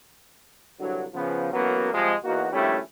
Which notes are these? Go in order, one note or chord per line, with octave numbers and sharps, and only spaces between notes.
C2 G2 D3 F#3
C#3 F3 B3
A1 F#2 F#3 A#3 B3
C3 F3 G3 G#3
E2 A#3 D#4 F#4
A#1 D#2 G3 A3 C#4 E4